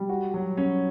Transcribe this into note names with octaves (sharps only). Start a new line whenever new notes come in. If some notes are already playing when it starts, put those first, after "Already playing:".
Already playing: G3
F#4
F#3
C#4